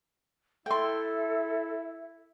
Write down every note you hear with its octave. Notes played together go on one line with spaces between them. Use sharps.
E4 A4 E5 G5 C6